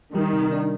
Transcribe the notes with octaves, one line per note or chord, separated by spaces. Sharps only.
D#3 G3
C3
D4